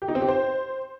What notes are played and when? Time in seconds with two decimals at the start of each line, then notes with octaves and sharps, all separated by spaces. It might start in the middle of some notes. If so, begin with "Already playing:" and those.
0.02 G4
0.08 D#4
0.15 C4
0.22 G4
0.28 C5